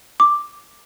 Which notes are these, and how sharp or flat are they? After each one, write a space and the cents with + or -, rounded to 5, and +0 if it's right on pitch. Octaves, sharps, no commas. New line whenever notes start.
D6 +5